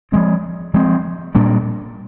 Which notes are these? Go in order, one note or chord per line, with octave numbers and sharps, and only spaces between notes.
F3 G#3 C4
F3 G#3 C4
A#2 G3 A#3 D4